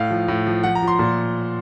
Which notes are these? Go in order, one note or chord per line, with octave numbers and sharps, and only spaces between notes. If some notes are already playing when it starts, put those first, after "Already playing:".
Already playing: A2 F5
F3
A2
F3
F3 F#5
A#5
F3
C6
A#2